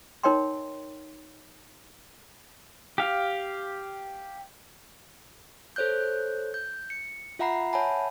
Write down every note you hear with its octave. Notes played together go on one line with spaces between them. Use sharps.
D#4 A#4 C#5 D#5 G5 C6
G4 F5
A4 C5 C#5 F#6 G6
G6
C#7
F4 E5 F#5 A#5 B5 C7
C#5 E5 F#5 G#5 A5 B5